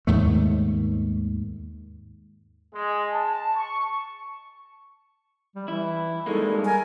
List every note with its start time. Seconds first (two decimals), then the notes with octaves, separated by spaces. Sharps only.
0.07 D#2 G#2 A3
2.74 G#3
3.13 A5
3.56 C#6
5.55 G3
5.68 E3 E4
6.26 D#3 G3 G#3 A#3 A4
6.65 A#4 G#5